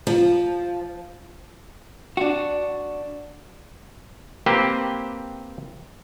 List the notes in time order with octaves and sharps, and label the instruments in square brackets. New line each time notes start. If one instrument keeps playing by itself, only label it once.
[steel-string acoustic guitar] F3
[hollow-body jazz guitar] D4 F#4
[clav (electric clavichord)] A#3 C4 G4 B4 C5